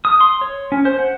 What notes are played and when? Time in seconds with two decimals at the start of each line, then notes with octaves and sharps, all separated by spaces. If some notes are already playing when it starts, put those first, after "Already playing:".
0.05 D#6
0.20 C6
0.41 C#5
0.72 C#4
0.85 C5
0.99 F#5